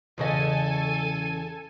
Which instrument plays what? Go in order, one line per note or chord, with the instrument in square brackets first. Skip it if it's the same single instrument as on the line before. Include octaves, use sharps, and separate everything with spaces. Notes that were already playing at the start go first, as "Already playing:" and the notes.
[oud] E2 C#3 D#5 [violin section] A4 G#5